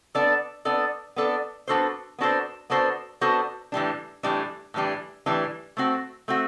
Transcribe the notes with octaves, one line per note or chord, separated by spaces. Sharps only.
B3 D4 A4 D5
B3 D4 A4 D5
B3 D4 A4 D5
B3 D4 F#4 A4 C5
B3 D4 F#4 A4 C5
B3 D4 F#4 A4 C5
B3 D4 F#4 A4 C5
A2 E3 G3 D4
A2 E3 G3 D4
A2 E3 G3 D4
A2 E3 G3 D4
A3 C4 F#4
A3 C4 F#4